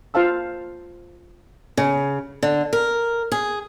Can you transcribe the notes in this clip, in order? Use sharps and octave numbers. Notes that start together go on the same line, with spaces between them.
F4 C5 F5 A5 E6
C#3
D3
A#4
G#4